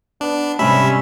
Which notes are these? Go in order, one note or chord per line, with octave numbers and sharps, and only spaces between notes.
B3 D4
G#2 C3 G3 C#4 E5 B5